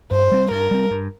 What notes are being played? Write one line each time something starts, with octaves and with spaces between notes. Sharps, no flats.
G2 C5
G3 C4
G2 A#4
G3 C4
G2